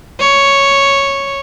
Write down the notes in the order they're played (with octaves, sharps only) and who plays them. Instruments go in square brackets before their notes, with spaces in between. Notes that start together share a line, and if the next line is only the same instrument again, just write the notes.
[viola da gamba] C#5